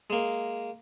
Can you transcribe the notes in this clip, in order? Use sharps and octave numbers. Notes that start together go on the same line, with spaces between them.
G#3 A#3